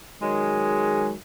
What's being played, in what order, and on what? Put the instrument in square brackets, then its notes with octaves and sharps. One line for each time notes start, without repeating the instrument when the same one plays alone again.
[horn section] D#3 F#3 G#3